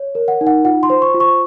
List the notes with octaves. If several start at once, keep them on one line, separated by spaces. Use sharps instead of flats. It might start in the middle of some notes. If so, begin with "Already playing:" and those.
Already playing: C#5
A#4
F#5
D#4
F#5
F4 F#5
C6
C5
C#6
F4
C#6